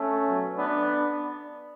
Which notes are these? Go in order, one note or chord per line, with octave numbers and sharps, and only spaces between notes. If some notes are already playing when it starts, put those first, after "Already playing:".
Already playing: A3 C#4
B2 F#3
B3 D4